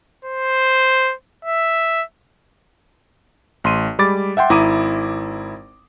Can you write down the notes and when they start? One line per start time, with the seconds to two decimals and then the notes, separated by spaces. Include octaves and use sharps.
0.25 C5
1.45 E5
3.64 A1 C6 D#7
3.99 G3 G#3 B5 D6 A6
4.37 E5 F#5 G5 C6
4.50 G#1 E4 A#5 D6 D#6 D#7